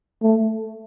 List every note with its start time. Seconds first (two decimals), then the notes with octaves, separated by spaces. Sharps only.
0.22 A3